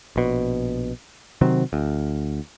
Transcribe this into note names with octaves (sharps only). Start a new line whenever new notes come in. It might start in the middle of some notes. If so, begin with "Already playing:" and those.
A#1 B2
C3 D#3 F#3 C4
D2